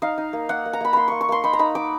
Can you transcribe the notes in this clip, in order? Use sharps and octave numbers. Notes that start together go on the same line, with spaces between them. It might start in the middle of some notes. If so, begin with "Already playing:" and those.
D#4 F5
D#4
A#3
A#3 F#5
A#3
A#5
A#3 B5
A#3 B5 C6
A#3 C#6
C#6
A#3 C6
D#4 B5
A#5
D#4 B5
D#4 D6